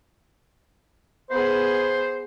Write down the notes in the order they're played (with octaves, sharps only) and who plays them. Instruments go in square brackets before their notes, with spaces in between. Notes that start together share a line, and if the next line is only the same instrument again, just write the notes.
[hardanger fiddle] B3 G#4 [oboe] C5